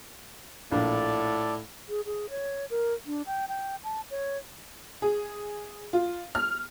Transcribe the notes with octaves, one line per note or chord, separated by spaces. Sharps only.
A#1 A2 A4 D5
G#4
G#4
C#5
A#4
D4
G5
G5
A5
C#5
G#4
F4
F6